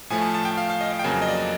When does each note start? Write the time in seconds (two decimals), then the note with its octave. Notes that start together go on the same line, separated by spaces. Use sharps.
0.10 A2 F3 A3 G#5
0.22 A5
0.34 A5
0.45 G5
0.57 F5
0.70 F5
0.81 D#5
0.93 D#5
0.99 G5
1.04 F2 C#3 F#3 A#3 G#5
1.22 D#5
1.28 D5